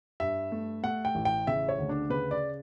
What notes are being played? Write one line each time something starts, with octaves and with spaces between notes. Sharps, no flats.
G2 E5
A3
A3 F#5
G5
A1
G5
C#3 E5
C#5
D2
D4
C#3 B4
D5